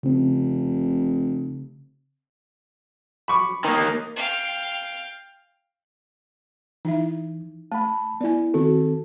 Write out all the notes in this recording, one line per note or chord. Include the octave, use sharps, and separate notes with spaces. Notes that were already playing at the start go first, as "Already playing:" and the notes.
F1 C#3 C4
B5 C#6 D6
D#3 A#3
F5 G5
E3 D#4 E4 E5
A3 A5 B5
B3 E4 D5 G#5
D#3 C4 F#4 A4